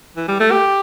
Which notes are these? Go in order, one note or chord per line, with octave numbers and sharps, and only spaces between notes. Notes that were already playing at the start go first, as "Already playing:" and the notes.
E3
G3
A3
G4